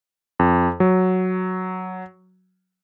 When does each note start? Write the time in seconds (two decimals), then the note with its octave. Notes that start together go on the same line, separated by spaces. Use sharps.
0.39 F2
0.80 F#3